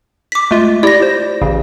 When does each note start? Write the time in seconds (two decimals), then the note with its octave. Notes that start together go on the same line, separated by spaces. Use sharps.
0.32 D6 B6
0.51 G#3 A3 F4
0.83 E4 G4 D5 A#6
1.02 C5
1.42 A1 C#3